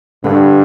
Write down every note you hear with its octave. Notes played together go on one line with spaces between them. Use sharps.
G2 D3